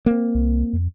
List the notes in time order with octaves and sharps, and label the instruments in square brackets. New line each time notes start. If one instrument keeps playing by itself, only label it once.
[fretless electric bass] A#3 C4
[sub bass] C2
F2